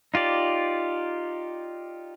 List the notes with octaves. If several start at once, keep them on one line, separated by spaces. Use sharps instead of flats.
D#4 F4 G4 D5